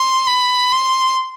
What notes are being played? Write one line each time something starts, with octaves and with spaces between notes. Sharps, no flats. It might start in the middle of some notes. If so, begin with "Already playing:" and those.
Already playing: C6
B5
C6